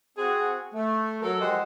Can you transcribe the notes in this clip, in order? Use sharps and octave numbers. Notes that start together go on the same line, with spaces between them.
C4 F#4 G#4
A3
F#3 A4 A#4
F3 G#3 G4 C5 D#5 F#5